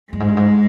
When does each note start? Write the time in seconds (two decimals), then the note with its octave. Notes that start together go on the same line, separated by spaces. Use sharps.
0.12 G2 G#3
0.20 G#2
0.28 G2
0.37 G#2